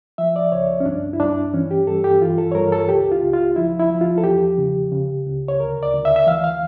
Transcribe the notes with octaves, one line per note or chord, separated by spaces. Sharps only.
F3 E5
D5
C#2 C#5
C#4
G2 D4
E4
G2 D4
E3 C#4
G4
G2 A4
G4
E3 F4
A4
C#5
G2 A#4
A4
C#2 G4
F4
C#2
F4
F3 E4
E4
F3
F4
A4
E2 G4
C#3
C#3
C#2
C#5
D2 A#4
D5
D2
E5
E5
E3 F5
F5